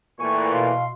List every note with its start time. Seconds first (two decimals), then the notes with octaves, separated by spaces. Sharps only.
0.19 A#2 E3 A3 G5 G#5 C#6
0.53 B2 F5 C6